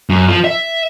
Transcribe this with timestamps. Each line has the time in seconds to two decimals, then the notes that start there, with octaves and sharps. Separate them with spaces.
0.10 F#2
0.28 F3
0.44 E5